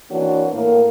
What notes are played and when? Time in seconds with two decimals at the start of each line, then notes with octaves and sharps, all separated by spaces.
0.11 E3 A#3 C4 D4 F#4 C#5
0.52 A2 A#3 A#4